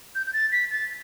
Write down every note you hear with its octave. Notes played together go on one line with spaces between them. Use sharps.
G6
G6
A6
B6
A6